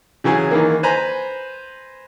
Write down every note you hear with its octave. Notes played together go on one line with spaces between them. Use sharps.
C#3 E3 F#3 G#4
D#3 E3 A#3
B4 C5 G#5 A#5 B5